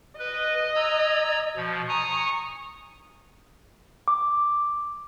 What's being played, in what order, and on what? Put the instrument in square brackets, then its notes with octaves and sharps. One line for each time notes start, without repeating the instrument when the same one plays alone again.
[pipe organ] B4 [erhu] D#5
[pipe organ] A#5 E6 G#6
B2 F3
[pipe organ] G#5 A#5 D#6 [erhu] C#6
[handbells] D6